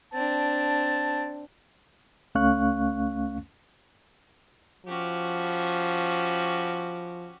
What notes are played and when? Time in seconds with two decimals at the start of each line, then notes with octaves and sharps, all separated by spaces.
0.13 C4 D4 A5
2.35 C#2 A3 C#4 F5 C#6 F#6
4.86 F3 C#4 F#4 G4